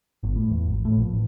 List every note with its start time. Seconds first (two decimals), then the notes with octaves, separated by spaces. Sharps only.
0.23 G1
0.36 A2
0.50 E2
0.67 G#1
0.85 A2
0.97 A#1
1.13 A1